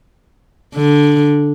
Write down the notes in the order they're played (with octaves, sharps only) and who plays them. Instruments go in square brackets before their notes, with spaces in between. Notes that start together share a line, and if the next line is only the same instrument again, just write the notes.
[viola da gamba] D3